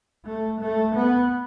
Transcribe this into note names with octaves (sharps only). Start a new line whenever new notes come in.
A3
A3
B3